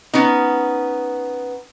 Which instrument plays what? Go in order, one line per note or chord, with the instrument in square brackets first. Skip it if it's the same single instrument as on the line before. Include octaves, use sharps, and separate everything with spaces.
[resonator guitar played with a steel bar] B3 C#4 D#4